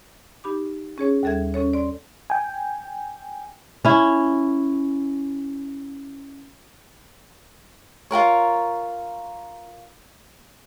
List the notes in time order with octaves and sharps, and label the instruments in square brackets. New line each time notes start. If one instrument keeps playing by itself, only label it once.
[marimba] D#4 G4 B5 D6
C#4 G#4 C#5
D#2 G3 A4 E5 G#6
C#4 A4 C#5
D5 C6
[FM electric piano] G5 G#5
[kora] C#4 E4
[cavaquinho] F4 F#4 A#4 C#5